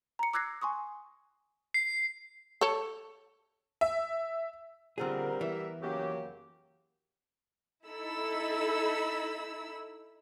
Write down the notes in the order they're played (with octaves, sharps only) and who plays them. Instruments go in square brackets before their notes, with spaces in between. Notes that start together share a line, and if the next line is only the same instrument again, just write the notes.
[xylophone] A#5 C#7
D6 E6 F#6 G#6 A#6 C7
G#5 C6 C#6 D#6
[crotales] C7
[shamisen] A4 C#5
[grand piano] E5
[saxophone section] A#2 C4 [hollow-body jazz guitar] D3 F4 G#4 [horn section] G3 A#4
[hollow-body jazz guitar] E3 B3 [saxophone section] E5
[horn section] F#2 A#3 G4 [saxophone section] C#3 F#3
[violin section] D#4 E4 A4 B5 E6